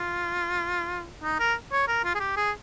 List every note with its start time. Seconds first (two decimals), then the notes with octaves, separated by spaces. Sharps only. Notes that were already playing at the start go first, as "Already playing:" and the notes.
Already playing: F4
1.23 D#4
1.40 A#4
1.72 C#5
1.88 A#4
2.05 F4
2.15 G#4
2.20 G4
2.37 G#4